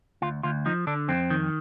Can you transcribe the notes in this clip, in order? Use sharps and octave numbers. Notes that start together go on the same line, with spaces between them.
D2 F4
D2 F4
F3 D#4
D3 D4
F2 C4
D#3